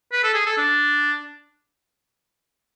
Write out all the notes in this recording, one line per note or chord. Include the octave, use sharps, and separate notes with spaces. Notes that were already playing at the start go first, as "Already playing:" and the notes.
B4
A4
G#4
A4
D4